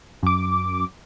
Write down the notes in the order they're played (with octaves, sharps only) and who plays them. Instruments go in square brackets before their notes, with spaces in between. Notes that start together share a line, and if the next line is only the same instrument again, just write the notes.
[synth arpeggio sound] F#2 D6